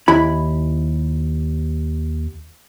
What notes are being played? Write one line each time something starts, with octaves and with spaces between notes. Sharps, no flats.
D#2 E4 B5